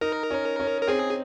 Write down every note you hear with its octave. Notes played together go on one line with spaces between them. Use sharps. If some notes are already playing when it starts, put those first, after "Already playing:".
D#4 A#4
C#4
C#4
A#4
C4 G#4